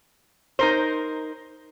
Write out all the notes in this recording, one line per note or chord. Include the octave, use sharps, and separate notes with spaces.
D#4 A#4 C5